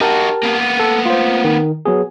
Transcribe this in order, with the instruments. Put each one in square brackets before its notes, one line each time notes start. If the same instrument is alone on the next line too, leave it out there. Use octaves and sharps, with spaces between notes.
[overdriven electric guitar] D#4 F#4 [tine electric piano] G4 A#4 A5
[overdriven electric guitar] A#3 B3
[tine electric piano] A4
F4 C5
D#3
F#3 B3 G#4